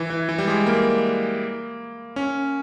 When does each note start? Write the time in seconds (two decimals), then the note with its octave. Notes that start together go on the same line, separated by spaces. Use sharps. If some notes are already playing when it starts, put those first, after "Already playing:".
Already playing: E3
0.10 E3
0.29 E3
0.38 G3
0.48 G#3
0.67 A#3
2.16 C#4